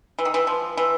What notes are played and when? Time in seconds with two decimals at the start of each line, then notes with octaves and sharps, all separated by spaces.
0.19 E3
0.25 D#3
0.34 E3
0.47 F3
0.77 E3